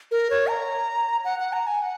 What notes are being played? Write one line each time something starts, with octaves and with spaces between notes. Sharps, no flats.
A#4
C#5
A#5
F#5
F#5
A#5
G#5
F#5